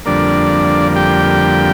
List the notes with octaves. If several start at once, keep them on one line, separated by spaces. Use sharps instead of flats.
F2 D3 G3 A#3 D4 D5
G4 G5